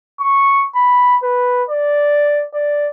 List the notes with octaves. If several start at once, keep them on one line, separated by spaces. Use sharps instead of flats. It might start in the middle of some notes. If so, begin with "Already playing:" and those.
C#6
B5
B4
D5
D5